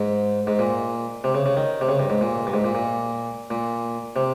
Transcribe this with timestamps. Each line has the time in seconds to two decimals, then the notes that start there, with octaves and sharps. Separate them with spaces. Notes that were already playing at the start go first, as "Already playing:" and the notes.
Already playing: G#2
0.47 G#2
0.59 A#2
1.24 C3
1.35 C#3
1.46 C#3
1.57 D#3
1.81 C3
1.89 C#3
1.99 G2
2.10 G#2
2.21 A#2
2.47 G2
2.54 G#2
2.64 A#2
2.75 A#2
3.50 A#2
4.16 C3